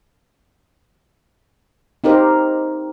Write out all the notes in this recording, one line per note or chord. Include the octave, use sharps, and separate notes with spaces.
C4 D#4 G4 A#4 C5